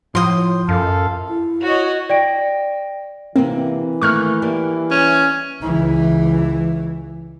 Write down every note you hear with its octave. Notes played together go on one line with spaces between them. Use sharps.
A2 F3 C6 D#6
F#2 A4 F5
E4
F#4 C#5 D#5
D5 G5 A#6 D7
C3 E3 A#3 C4
D#3 A3 A#3 C#6 F6 F#6
G3 A#3 G4
C#4
C#2 E3